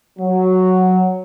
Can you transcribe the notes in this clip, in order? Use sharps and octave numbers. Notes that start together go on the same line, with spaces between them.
F#3